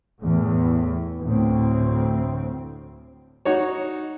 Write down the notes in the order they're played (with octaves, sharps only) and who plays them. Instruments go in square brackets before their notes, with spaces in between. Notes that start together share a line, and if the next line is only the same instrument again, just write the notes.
[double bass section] E2 A2
D2 A2 C4
[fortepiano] D#4 F#4 C#5